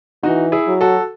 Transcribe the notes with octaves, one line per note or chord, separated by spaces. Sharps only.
E3 D#4 F#4
E4 G#4
F#3
F#4 A4